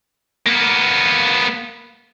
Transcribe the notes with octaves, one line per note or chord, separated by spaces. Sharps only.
A#3 B3